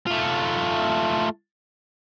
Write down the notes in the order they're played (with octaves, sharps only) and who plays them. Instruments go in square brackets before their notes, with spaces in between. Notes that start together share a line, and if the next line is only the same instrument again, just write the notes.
[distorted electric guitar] A3 F4